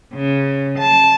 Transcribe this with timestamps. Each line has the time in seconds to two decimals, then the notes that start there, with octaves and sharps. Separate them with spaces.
0.14 C#3
0.78 A5